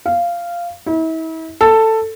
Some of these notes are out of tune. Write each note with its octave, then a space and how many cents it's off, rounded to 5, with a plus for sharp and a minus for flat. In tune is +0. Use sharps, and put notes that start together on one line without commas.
F5 -10
E4 -40
A4 +10